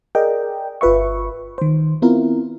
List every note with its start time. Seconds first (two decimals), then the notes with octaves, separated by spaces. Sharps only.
0.15 G#4 A#4 D5 D#5 G5
0.81 G1 F4 B4 E5 C#6
1.58 D#3 C5
2.02 B3 C4 E4 F4 A#4